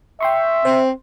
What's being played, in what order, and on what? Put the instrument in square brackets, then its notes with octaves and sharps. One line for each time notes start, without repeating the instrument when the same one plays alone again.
[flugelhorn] E5 [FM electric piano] G5 C6 C#6
[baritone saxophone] C4 [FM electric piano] C5